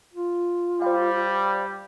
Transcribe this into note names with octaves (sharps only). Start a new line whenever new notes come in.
F4
G3 C5 F5